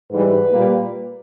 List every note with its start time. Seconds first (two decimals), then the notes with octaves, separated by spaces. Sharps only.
0.11 G#2 E3 G3 B4
0.52 A#2 G3 A#3